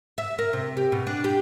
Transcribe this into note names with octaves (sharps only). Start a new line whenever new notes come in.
E5
A#4
C3
G4
B2
D4
G4